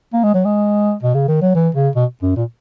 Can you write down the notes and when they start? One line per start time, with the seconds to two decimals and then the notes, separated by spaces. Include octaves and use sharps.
0.13 A#3
0.23 G#3
0.34 F#3
0.45 G#3
1.02 B2
1.14 C#3
1.28 D#3
1.41 F#3
1.55 E3
1.75 C#3
1.95 B2
2.22 F#2
2.36 A#2